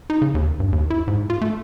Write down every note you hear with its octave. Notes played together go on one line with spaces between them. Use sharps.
D#4
C#3
D#2
G2
D#2
E4
G#2
F4
A3